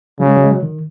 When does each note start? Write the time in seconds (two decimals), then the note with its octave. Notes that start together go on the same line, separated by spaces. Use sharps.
0.20 C#3 F#3
0.28 G#3
0.36 F#3
0.44 G#3
0.52 F#3
0.63 D#3